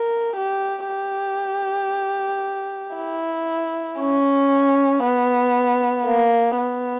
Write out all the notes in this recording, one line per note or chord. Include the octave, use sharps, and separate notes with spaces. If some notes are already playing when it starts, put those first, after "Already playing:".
Already playing: A#4
G4
G4
E4
C#4
B3
A#3
B3